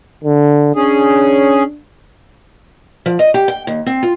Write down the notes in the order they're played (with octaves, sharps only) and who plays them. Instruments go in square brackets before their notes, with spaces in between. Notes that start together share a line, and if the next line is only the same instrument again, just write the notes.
[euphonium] D3
[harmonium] C#4 G#4 [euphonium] D4
[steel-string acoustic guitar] F3
D#5
G4
G5
D#2
C4
F4